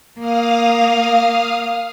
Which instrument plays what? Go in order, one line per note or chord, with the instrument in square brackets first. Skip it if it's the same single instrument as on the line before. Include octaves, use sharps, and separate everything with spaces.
[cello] A#3 [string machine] F5 D#6 F6